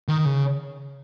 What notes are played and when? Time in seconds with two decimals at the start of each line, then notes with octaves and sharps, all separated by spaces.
0.08 D#3
0.25 C#3